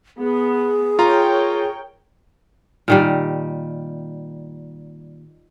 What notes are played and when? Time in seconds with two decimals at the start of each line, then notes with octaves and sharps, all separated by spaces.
0.18 B3 G#4
0.99 F4 A#4 C#5 G5 A#5
2.88 A#2 D#3 G3